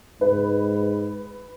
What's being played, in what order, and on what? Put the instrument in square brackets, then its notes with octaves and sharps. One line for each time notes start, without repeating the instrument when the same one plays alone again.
[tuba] G#2 [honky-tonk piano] B4